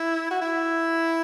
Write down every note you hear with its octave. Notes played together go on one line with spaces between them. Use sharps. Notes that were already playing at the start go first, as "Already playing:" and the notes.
Already playing: E4
F#4
E4